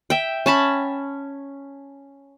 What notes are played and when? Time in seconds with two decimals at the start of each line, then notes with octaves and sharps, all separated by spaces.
0.10 E5 G5
0.46 C#4 A5 B5